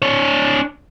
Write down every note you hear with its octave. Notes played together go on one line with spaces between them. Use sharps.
D4 C#5